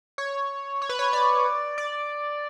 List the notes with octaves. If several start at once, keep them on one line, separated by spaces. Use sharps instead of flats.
C#5
C#5
B4
C#5
D5
D5